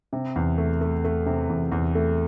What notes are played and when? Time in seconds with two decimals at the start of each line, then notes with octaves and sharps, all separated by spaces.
0.13 C3
0.36 E2
0.58 A3
0.81 A3
1.04 A3
1.26 C3
1.49 E2
1.72 E2
1.95 A3